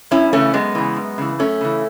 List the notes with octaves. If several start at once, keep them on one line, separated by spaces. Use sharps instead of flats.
F#2 C#4 E4
C#3 E3 A3 C#4
F#2 G#3 B3
C#3 E3
F#2
C#3 E3
F#2 A3 C#4
C#3 E3